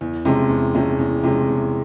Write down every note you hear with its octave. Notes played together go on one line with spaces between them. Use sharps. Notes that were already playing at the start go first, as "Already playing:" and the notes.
E2
C3 F3 G#3 C#4
E2
C3 F3 G#3 C#4
E2
C3 F3 G#3 C#4
E2